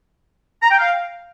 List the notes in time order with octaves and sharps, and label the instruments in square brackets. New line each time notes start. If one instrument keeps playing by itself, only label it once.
[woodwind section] A#5
G5
F5